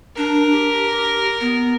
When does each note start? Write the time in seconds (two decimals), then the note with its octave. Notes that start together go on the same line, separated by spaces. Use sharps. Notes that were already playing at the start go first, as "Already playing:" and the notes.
0.17 D4 A#4
0.51 G4
1.40 B3